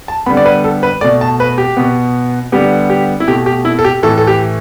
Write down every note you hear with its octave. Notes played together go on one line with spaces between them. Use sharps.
A5
D3 G3 B3 B5
D5
B4
A4
B4
B2 A3 D5
A5
B4
G4
B2 B3
D3 G3 B3 G4
G4
E4
B2 A3 G4
G4
E4
A4
G4
A2 E3 A3 A4
A4
G4